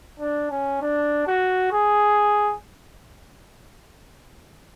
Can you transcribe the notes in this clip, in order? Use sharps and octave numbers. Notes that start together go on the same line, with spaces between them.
D4
C#4
D4
F#4
G#4